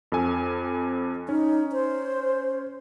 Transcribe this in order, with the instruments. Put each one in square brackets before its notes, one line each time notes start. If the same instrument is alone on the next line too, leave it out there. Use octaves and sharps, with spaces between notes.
[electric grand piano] F2 A4 G#5
[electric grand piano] C#4 [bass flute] D#4
[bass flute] C5